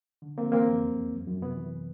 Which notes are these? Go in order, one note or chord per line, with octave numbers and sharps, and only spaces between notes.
D3
D3 A#3 C4
E3 A#3 C4
F2
E2
E2
F#2
F#2
C3 B3
E3